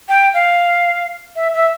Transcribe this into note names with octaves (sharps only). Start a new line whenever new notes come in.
G5
F5
E5
E5